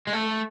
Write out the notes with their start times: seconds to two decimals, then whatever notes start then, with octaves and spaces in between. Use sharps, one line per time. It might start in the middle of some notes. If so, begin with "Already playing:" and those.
0.07 G#3
0.13 A3